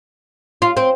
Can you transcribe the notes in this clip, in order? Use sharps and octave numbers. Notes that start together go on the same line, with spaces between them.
F4
C4